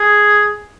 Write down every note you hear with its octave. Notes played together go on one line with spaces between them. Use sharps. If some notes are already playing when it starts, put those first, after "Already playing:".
Already playing: G#4